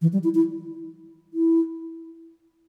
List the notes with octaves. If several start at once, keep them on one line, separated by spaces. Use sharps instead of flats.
E3
G3
E4
E4
E4